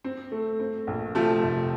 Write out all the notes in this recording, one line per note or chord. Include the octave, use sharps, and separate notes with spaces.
C4
A3
C4
A#1
C3 F3 A3
F1